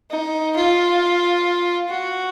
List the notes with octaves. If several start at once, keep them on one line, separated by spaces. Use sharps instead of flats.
D#4
F4
F#4